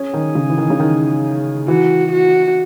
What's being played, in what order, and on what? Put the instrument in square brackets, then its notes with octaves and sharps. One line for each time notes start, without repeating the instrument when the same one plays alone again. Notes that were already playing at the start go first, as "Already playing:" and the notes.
Already playing: [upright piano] C#4 [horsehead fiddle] G#4
[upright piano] D#3
C#3
E3
D#3
C#3
D#3
[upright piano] E3 [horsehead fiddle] F#4
[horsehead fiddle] F#4